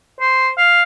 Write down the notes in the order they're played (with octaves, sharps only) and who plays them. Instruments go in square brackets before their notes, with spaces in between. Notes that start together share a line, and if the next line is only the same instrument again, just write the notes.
[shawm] C5
F5